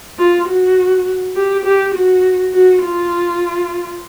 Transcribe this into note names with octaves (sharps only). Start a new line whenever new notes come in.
F4
F#4
G4
G4
F#4
F#4
F4